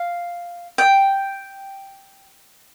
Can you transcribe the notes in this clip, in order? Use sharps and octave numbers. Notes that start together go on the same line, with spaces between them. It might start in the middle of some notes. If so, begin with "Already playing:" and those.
Already playing: F5
G5